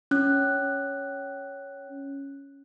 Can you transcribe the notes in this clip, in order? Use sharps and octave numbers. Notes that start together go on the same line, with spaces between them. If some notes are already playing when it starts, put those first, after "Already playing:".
C#4 F#6